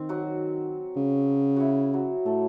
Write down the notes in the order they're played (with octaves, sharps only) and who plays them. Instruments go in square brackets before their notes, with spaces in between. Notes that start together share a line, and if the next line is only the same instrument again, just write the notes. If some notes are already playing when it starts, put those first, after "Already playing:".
Already playing: [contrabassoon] D#3 [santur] C4
[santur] F#3 F#4
[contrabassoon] C#3
[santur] E4 F#4
F#3 F#4
[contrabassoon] A2 [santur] A3 A4